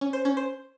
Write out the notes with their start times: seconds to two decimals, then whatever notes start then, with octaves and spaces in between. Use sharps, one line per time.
0.01 C#4
0.13 C5
0.25 C#4
0.37 C5